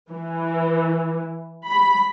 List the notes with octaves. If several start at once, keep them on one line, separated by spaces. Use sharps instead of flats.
E3
B5